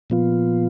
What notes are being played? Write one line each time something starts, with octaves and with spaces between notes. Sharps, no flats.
A#2 F3 B3 F4